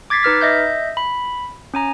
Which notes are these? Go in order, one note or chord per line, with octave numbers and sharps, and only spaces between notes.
D6 G#6 A6 B6 C7
D#4 B4 F6 B6
D#5 E5 G6
B5
C#4 G#5 A#5